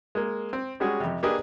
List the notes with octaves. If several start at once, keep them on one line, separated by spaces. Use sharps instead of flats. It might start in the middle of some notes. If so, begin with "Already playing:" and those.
G#3 A#3
C4
G3 G#3 C#4 F#4 G#4
F2 C3
A#3 D4 G4 G#4 B4 D#5